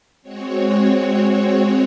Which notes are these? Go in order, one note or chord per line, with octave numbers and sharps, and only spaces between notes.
G#3 C4 F#4 C#5